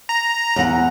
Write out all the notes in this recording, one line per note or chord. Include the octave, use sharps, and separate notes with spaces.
A#5
E2 F#5